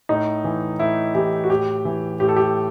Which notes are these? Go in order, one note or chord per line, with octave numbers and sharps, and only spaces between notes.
A2 D#4
E3
A2 E4
E3 G4
F#4
A2 G4
E3
A2 G4
A4
G4